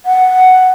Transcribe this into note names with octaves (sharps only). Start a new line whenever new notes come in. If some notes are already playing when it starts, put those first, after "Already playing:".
F#5